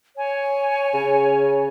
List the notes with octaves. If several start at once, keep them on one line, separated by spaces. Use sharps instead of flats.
C#5 G#5
C#3